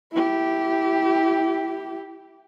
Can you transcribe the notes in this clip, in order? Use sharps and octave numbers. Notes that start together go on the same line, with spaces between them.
E4 G4